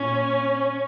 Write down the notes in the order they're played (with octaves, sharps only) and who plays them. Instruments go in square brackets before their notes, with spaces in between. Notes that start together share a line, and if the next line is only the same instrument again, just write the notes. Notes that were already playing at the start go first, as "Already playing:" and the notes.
Already playing: [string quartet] A#2 C#4